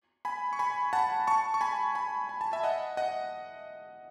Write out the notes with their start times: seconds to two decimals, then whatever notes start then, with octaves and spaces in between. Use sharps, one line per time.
0.25 G#5 B5
0.53 C#6
0.59 G#5 B5
0.93 F#5 A5
1.27 A5 C#6
1.54 C#6
1.61 G#5 B5
1.95 G#5 B5
2.29 G#5
2.41 A5
2.52 E5 G#5
2.63 D#5 F#5
2.97 D#5 F#5